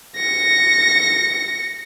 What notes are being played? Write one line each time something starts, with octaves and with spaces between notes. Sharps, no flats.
A#6 C#7